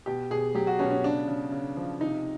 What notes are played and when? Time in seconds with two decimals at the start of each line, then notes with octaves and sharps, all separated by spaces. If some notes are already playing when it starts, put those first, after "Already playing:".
0.06 B2 G4
0.31 B2 G#4
0.55 F#3 G4
0.67 F#4
0.79 B2 C#4
0.91 C#4
1.04 C#3 D4
1.28 C#3
1.52 C#3
1.77 F3
2.01 C3 D#4